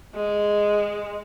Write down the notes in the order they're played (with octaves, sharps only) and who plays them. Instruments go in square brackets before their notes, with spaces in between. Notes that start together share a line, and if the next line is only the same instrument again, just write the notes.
[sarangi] G#3